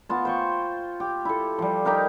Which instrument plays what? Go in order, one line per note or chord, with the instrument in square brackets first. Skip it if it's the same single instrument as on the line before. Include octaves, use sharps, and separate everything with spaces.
[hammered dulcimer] B3 F4 A5
C5 G5 C#6
G4
E4 A4
F3 G3
D#4 G4 A#4 F5